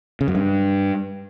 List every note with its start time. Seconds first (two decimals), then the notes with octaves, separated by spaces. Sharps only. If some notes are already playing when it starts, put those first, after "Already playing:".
0.21 C#3
0.28 F#2
0.35 G2